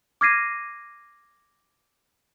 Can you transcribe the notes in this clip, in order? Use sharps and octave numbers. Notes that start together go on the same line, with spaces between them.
D6 F6 G#6 A#6 C7 D#7